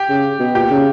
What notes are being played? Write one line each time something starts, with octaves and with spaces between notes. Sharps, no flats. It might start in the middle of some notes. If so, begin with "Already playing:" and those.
Already playing: G4
C#3
B2
A#2 G4
C#3